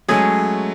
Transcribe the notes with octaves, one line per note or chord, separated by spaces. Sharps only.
F#3 G#3 A3 C#4 G#4